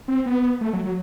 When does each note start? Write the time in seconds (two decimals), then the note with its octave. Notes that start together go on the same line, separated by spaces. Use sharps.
0.08 C4
0.26 B3
0.61 A3
0.73 F#3
0.85 F#3